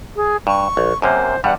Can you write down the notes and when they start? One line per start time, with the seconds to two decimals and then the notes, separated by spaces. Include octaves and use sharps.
0.16 G#4
0.47 G2 C#6
0.77 A#1
1.02 F#2 C3 A#3 C5
1.44 E2 G2 G3 F#5